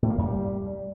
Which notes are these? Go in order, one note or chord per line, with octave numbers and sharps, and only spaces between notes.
A2
A#3
F#2
G3